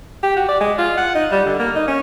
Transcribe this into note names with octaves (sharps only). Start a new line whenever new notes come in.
G4
F#4
D5
G#3
F4
F#5
D#4
G3
D3
A#3
D#4
C#4